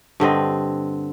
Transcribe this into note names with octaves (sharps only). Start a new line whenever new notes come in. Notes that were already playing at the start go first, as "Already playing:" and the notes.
G2 D3 C4 D#5